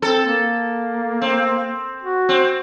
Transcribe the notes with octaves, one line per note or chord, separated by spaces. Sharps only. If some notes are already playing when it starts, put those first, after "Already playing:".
C4 A4
A#3
C4
F#4
C4